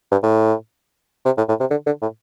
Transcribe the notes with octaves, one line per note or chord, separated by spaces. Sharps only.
G2
A2
C3
A2
A2
C3
D3
D3
A2